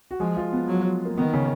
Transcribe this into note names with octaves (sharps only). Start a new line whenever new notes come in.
F#4
F3 G#3 G#4
F3 F4
B3
F#3
A#3
D#3 B3
C#3 C#4